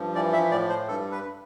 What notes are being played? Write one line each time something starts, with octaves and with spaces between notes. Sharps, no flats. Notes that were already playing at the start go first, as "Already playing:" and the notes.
Already playing: G2 F3
E3 D5
E5
A2 D5
C5
G2 A4
B4